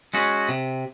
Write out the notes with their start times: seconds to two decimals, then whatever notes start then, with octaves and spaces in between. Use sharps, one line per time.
0.14 G#3 C#4 F#4
0.49 C3